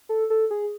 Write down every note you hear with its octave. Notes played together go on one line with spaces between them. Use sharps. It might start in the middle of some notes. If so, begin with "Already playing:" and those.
A4
A4
G#4